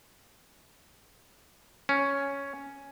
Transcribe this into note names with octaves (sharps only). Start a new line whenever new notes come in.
C#4